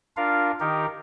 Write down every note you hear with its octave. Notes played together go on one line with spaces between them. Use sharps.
D4 F4 A#4 F5
D#3 D#4 G4 A#4